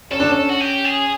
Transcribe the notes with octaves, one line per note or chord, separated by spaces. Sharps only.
C#4 A4
D4
C#4
F#4
G4
G#4